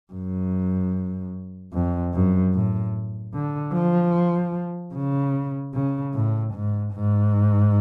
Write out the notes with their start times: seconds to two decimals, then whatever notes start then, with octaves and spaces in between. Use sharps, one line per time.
0.13 F#2
1.73 F2
2.13 F#2
2.54 A2
3.34 D3
3.74 F3
4.94 C#3
5.75 C#3
6.15 A2
6.54 G#2
6.94 G#2